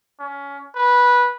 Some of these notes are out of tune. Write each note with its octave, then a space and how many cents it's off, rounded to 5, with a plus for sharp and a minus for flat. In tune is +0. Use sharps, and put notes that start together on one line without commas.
C#4 +20
B4 -15